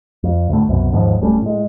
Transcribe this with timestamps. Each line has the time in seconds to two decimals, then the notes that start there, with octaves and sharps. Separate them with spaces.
0.24 F2
0.49 D2 A2
0.68 C2 F#2 B2
0.92 D#2 G#2 E3 F3
1.21 D1 G3 A3 C#4
1.42 A2 G#3